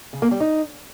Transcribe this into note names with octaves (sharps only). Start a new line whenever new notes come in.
C#3
A#3
G3
D#4